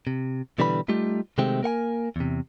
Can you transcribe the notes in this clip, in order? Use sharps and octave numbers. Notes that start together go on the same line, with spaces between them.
C3
B2 D3 E3 G3 B4 B5
G3 A3 D#4 F4 G4
C3 D#3 G#3 A3 C4 G4
A#3 A#4 F#5 G#5
E2 C3